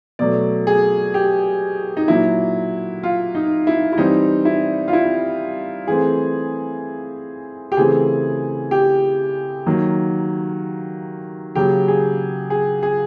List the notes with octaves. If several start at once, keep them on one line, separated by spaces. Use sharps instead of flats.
B2 F#3 A3 D5
G#4
G4
D#4
A#2 F#3 A#3 E4
F4
D#4
E4
E4
E3 G3 C4 D#4
E4
F4
E4
E3 A3 C4 G#4
G4
C#3 E3 A3 C4 G#4
G4
D#3 F#3 A#3
C#3 F#3 A#3 G4
G#4
G#4
G#4